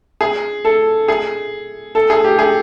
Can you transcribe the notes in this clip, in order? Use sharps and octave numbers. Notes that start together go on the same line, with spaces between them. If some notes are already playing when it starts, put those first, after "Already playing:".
G#4
A4
G#4
A4
G#4
G4
G#4